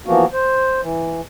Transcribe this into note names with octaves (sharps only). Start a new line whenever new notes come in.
E3 F3 A#3 B3 F#4
C5
E3